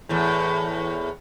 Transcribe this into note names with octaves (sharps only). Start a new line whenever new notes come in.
E2 A2